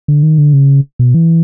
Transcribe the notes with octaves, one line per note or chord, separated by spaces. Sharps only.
D3
D#3
D3
C#3
B2
E3